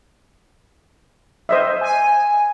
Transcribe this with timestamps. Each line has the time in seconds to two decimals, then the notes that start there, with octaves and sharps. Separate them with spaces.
1.49 C5 D#5 E5
1.81 G#5